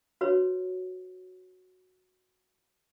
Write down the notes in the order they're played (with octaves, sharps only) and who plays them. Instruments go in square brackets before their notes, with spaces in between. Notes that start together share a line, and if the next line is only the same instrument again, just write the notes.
[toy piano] F#4 B4 C#5